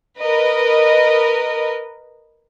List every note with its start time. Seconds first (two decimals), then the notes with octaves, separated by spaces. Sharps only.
0.18 A#4 B4 D#5